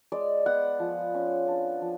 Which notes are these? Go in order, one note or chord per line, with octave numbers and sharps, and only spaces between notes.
G#3 D5
B3 F#5
F3
C#4
D4
F3